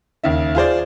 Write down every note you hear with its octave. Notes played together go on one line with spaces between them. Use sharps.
D#2 C#3 E5
F4 G#4 C5 D5